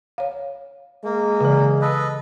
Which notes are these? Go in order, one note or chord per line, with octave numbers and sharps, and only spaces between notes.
C#5 F5
G#3 A#3
C#3 E3
A4 B4 D#5